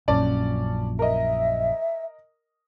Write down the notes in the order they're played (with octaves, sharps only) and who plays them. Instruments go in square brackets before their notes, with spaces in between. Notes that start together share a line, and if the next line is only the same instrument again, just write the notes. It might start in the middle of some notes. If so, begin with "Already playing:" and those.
[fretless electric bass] A#1 F#2 A#2 [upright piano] C#4 D5 A5
[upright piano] A#4 D#5 [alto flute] E5